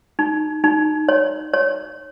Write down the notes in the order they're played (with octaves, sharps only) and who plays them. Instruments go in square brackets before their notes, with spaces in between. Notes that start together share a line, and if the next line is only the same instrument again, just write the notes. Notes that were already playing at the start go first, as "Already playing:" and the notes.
[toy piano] D#4
D#4
C#5
C#5